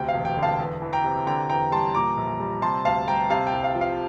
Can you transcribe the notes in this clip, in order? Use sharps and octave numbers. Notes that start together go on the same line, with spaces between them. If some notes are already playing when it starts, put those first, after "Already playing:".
Already playing: D2 C3 G5
F5
E1
G5
D3
F5 A5
E2
E3
G5 A#5
C3
D3 G5 A#5
E2 G5 A#5
G3 A5 C6
A#2 A#5 D6
A#1
G3
C3 A5 C6
D2 F5 A5
G3 G5 A#5
C3 F5 A5
G5
C2
F5
F3
F5